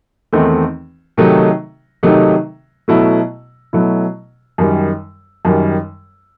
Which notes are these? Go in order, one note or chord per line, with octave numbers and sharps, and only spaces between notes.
E2 D#3 A3 C4 D#4
C3 D#3 F#3 A3 D#4
C3 D#3 F#3 A3 D#4
B2 F#3 A3 E4
B2 F#3 A3 E4
F#2 D#3 G3
F#2 D#3 G3